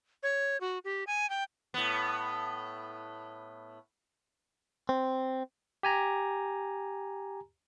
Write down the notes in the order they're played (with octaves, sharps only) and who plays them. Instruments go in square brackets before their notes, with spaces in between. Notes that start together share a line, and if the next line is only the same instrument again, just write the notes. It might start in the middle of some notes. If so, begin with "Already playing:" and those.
[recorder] C#5
F#4
G4
G#5
G5
[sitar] A2 B3
[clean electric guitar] C4
[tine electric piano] G4 G#5 A#5